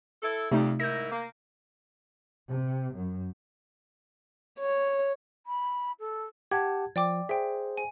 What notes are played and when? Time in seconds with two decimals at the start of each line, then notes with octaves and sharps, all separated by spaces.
0.23 E4 A4
0.51 F2 C3 G3 A3 D#4
0.80 G#2 E4 A#4 G6 A#6
1.10 A#3
2.49 C3
2.95 F#2
4.59 C#5
5.46 B5
6.00 A4
6.51 G4 F#5 A5 G#6
6.96 F3 D5 G5 D6
7.29 G#4 C5 E5 G5
7.77 G#5